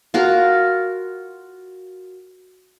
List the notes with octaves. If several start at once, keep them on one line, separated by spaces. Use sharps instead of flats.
F4 F#4 A#4